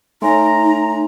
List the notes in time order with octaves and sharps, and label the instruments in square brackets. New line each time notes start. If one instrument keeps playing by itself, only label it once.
[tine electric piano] A3 [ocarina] D#4 [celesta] C#5 G#5 C6 [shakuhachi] A#5